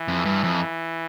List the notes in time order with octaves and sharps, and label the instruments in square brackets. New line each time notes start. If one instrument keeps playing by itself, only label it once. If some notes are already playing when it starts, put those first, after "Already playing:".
Already playing: [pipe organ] E3
[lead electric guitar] F2
G2
F2